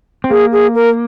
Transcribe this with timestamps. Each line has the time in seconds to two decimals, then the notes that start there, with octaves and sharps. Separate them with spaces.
0.24 C4
0.30 A#3 G#4
0.52 G#4
0.75 A#4